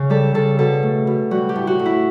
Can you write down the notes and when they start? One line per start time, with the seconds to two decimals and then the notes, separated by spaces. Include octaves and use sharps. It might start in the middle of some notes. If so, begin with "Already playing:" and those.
Already playing: C#3
0.10 G3 A4
0.34 C#3 A4
0.59 B2 A4
0.83 A3
1.07 B2
1.31 G3 F#4
1.49 G4
1.55 A2
1.67 F#4
1.79 A2
1.86 E4